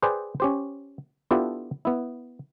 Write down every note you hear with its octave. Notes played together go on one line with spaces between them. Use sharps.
G#4 B4 C5 D5 G5 G#5
C#4 G4 C5
B3 D4 E4 F4 G4 A4
B3 E4